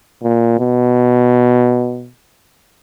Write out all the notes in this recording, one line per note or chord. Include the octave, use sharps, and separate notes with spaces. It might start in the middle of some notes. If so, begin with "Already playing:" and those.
A#2
B2